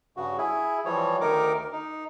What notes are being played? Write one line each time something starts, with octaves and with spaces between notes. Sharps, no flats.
G2 C#3 F#4
E4 G#4
E3 F3 G3 C#5
D2 D#3 D#4 A#4 D6
D#4